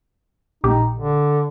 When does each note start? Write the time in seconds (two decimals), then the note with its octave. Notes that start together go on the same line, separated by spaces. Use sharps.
0.64 A#1 D#4 G4
0.99 D3